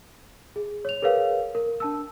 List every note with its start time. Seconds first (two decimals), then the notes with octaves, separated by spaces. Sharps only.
0.56 G#4
0.85 C#5 F7
1.02 G#4 A#4 B4 C#5 F5
1.55 A#4
1.80 D4 A5 E6